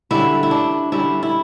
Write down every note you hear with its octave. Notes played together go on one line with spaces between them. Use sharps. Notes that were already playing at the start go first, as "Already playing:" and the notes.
D3 G3 C#4 E4
E4
D4
D3 G3 C#4 E4
E4